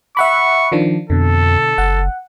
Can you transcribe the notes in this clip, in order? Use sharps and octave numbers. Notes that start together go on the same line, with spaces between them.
E5 F#5 B5 C#6
D#3 F3 D4
F2 B2 D3 A4
F#1 F#5